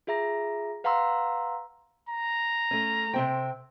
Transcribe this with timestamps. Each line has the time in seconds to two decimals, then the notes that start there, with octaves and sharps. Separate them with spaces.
0.07 F4 G#4 E5 A#5 A#6
0.84 B4 F5 F#5 A#5 C6 E6
2.09 A#5
2.71 A3 C#4
3.14 C3 C4 G5